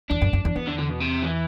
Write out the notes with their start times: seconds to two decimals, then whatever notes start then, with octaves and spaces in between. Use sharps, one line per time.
0.10 E2 D4
0.22 F#2
0.33 F#2
0.45 E2
0.56 E2 B3
0.68 D3
0.79 D3
0.90 B2
1.01 C3
1.23 E3